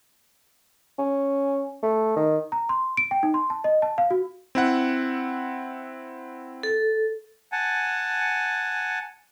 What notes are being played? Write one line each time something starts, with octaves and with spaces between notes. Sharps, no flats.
C#4
A3
D#3
A#5
C6
D7
G5
D#4
C6
A5
D#5
A5
F5
F#4
C4 E4 F#5
A4
F#5 G#5 A5